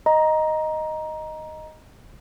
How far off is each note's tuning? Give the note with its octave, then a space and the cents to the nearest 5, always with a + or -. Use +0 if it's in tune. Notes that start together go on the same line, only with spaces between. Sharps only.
D#5 +0 A#5 +15